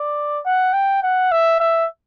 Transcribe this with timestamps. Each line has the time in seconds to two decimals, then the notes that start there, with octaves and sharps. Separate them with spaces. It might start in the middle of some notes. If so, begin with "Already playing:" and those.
Already playing: D5
0.45 F#5
0.73 G5
1.03 F#5
1.31 E5
1.60 E5